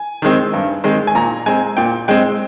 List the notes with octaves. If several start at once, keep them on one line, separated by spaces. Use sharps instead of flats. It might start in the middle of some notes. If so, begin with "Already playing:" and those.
Already playing: G#5
D#3 G#3 C4
G2
D#3 G#3 C4
G#5
A#2 A#5
G#3 C4 G#5
A#2 G5
G#3 C4 G5